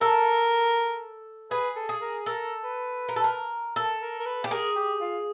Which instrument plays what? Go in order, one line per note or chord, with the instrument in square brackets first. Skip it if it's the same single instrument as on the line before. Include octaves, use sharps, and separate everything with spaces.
[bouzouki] A4 [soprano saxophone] A#4
[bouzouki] G#4 [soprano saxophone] B4
[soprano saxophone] A4
[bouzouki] G#4
[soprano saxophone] A#4
[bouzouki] A4 [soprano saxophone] A#4
[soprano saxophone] B4
[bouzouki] A#4
A4
A#4
[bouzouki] A4 [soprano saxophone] A#4
[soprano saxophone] A#4
A#4
B4
[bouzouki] G4
[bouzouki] G#4 [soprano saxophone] A#4
[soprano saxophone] G4
F4